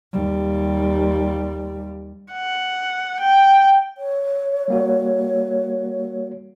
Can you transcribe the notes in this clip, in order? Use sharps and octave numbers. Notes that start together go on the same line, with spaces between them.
D#2 G3
F#5
G5
C#5
G3 A#3 F#4